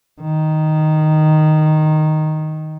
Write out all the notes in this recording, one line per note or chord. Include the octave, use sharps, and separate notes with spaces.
D#3